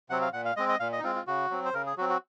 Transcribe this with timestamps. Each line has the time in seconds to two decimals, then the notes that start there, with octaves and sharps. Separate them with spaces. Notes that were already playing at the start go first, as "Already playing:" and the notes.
0.10 C3 F#3 C4 F#5
0.21 F5
0.33 A#2 F#5
0.45 F5
0.57 G#3 C4 D#5
0.69 D#5
0.80 A#2 F5
0.93 D#5
1.00 D#4
1.04 G#3 C4 F4
1.15 F4
1.27 C#3 F#4
1.51 F#3 C4
1.65 C5
1.74 C#3 A#4
1.86 G#4
1.97 F#3 F#4
2.01 C4
2.09 F#4